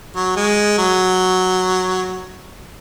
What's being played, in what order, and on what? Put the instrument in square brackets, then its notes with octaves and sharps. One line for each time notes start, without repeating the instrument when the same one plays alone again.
[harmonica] F#3
G#3
F#3